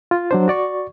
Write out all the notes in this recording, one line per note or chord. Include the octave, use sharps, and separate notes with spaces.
F4
F#3 D4 C5
F#4 D5 C#6